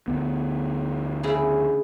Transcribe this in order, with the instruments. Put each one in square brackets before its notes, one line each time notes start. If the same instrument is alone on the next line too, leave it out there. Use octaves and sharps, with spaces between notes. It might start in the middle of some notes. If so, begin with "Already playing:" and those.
[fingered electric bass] D2 B3
[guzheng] C#3 E4 G#4